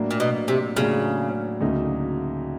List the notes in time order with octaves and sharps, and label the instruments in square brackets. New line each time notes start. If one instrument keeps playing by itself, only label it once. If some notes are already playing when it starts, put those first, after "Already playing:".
Already playing: [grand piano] A2 F#3 A#3 D4
[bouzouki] A#2
B2
C3
[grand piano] A2 F#3 A#3 D4 [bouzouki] C#3
[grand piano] D2 C#3 F#3 A#3 D#4